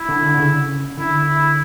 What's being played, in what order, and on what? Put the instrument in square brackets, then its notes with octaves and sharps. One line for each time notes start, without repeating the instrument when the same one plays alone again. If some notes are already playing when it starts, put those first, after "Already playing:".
Already playing: [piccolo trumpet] E4
[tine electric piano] D3
D3
D3
C#3
[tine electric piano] D3 [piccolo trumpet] E4
[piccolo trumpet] E4